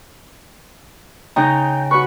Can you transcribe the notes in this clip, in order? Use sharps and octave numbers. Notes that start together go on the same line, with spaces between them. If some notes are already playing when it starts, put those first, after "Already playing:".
C#3 D#4 G5 A#5
F#4 B4 C#6